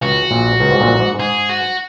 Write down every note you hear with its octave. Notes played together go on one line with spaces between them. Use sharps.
C#2 C#3 F#4
A#1 A#2
C#2 C#3
G#2
A#1 A#2
G#2
G#2 G#4
F#4